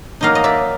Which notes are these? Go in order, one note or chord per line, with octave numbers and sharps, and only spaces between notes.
F#3 A#3 D#4 D#5 F5
D#5
D5 E5